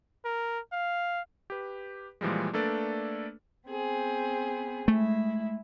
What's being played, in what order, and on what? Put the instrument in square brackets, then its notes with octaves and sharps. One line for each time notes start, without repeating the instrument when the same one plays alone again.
[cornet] A#4
F5
[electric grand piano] G4 B4
A#2 E3 F3 G3 G#3
A3 A#3 D4 A4 B4 D5
[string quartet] B3 C4 G#4
[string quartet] G#3 E4 [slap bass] A3